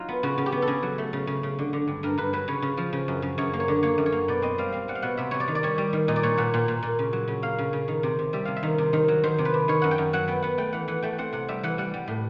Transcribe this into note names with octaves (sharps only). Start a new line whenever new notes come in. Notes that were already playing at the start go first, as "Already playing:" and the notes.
Already playing: F#3 D#4 F4
B3
C#3 F#4
C#3
G4
B3
A4
C#3 G#4
F#3
A3
C#3
C#3
C#3
D3
D3
G2
G2 A#4
G2 B4
F#3 B4
C#3 C#5
C#3
F3
C#3
F#2
C#3
F#2 C#5
A#3
C#5
D3
A#3 C#5
F#2
C#5
A#3
B2 D5
C4 D#5
G3 F5
C4 F5
G3 F#5
F5
B2 F#5
C3 E5
C3 C#5
D5
D#3
D5
G3 C#5
G3
D#3
A#2 D#5
D5
A#2 C#5
A#2 F#5
A#2
A#2
A#2
C#3
F#3
C#3
A#3 F5
C#3
C#3
D#3
C3
C3
G3 E5
C3 F5
E5
D#3
C3
D#3
F#3
D#3 C5
C3
B4
C3
D#3 C#5
F#2 F#5
G5
F#2
F#3 F#5
B3 G5
B3 F#5
A3 G5
E3 F#5
E3 F#5
A3 G5
C4 F#5
C3 F#5
G3 E5
E3 F#5
G3 F#5
G3
A2